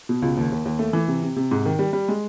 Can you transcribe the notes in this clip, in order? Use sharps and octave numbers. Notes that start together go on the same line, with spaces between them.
B2
C#2
D#2
D#2
D#2
A3
E3
C3
C3
C3
G#2
D#3
G3
G3
G#3